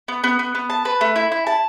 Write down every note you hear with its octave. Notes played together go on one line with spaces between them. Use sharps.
B3
B3
B3
B3
A5
B4
A3
E4
E4
A5